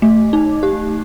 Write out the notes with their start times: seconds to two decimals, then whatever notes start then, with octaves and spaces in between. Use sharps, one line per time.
0.02 A3
0.33 D#4
0.63 G4